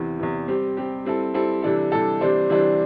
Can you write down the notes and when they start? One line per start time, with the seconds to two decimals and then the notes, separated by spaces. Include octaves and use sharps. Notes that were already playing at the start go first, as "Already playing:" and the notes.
Already playing: E2 C3 E3
0.19 E2 C3 E3
0.48 G3 C4 G4
0.77 G3 C4 G4
1.05 G3 C4 E4 A4
1.34 G3 C4 E4 A4
1.62 C3 E3 G3 D4 A4
1.92 C3 E3 G3 D4 A4
2.21 C3 E3 G3 D4 C5
2.49 C3 E3 G3 D4 C5